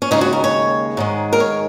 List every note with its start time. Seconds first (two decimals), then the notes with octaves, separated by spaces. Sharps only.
0.02 C#4
0.11 D#2 C#3 G#3 D#4
0.21 F#4
0.33 A#4
0.44 C#5
0.97 G#2 D#3 G#3
1.33 A#4
1.40 C#5